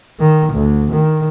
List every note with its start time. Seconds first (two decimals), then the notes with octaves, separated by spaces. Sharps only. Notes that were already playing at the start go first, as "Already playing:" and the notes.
0.20 D#3
0.53 D2
0.93 D#3